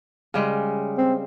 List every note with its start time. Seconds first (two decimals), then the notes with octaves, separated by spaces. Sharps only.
0.34 C#3 G3 G#3
0.98 C4